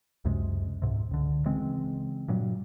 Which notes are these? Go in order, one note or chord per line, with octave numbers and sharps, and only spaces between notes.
C#2 F#2 C3 G#3
C#2 G#2 C3
C#2 D3
C#3 E3 G#3 C4
G2 A#2 F#3